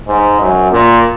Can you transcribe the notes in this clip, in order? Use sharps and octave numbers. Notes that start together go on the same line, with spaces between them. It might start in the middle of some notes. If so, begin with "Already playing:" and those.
G#2
F#2
A#2